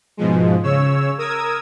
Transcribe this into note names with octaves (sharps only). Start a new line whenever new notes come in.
G#2 B2 F3 G#3
C#3 C#5 E6
A#4 D#6 E6 G#6